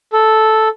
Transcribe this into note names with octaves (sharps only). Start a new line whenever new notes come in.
A4